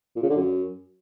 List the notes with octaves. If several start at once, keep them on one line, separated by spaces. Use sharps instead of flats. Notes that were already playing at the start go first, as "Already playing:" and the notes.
A#2
C#3
D3
F#2